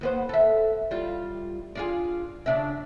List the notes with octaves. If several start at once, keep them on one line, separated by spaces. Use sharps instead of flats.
D#2 B3 C5
A4 E5
G3 F4
D4 F4 G#4
C#3 D4 E5